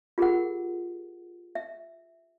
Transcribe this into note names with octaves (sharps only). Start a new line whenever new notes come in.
F4 G4 G#4 A#4 F#5
E5